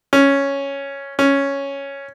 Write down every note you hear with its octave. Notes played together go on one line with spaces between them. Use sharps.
C#4
C#4